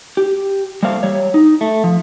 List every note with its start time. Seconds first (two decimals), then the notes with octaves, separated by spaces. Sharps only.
0.17 G4
0.83 G3 A3 A#3 C5 F5
1.03 G3 C#5
1.34 D#4
1.61 A3
1.84 F3